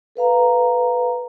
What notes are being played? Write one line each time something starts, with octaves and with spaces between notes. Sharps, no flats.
A4 B4 F5 A#5